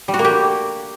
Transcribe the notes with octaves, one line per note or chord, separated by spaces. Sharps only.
G3
F#4
A#3
G4